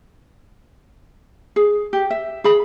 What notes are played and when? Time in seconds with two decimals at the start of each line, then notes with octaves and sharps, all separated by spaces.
1.56 G#4
1.93 G4
2.10 E5
2.44 G#4 B5